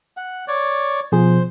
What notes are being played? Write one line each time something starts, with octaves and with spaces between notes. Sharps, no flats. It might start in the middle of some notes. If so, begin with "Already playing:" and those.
F#5
C#5 D5
B2 F3 G#4 C5